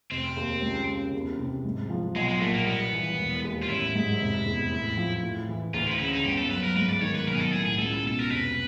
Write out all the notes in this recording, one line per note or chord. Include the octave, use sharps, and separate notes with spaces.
F1 C4
D#2
C#2
C#3
E2
C3
G#2
F3
B1 G#3
G#3
A#2 A3
A#3
G2 B3
E3
E1
D#2
F4
A1 E4
G#2
F1
E2
A2
F3
A2
E3
D2 F4
E4
D#4
C#3 E4
D#4
G1 G4
A4
F#2 B4
A#4
G#2 B4
D5
D#3 C#5
B4
B1 A#4
G#4
A4
A2 G#4
G#4
C#2 A4
B2 A4
A#4
F1 B4